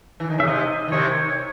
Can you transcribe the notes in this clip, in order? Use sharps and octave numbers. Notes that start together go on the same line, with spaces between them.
E3
D#3
C#3 E5
C3 D#5
E3
C3 D#3 C#5